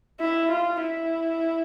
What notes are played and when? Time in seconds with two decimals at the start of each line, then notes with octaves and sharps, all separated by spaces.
0.20 E4
0.51 F4
0.83 E4